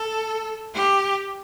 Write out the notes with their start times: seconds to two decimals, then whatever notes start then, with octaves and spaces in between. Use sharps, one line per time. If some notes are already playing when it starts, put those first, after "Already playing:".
Already playing: A4
0.74 G4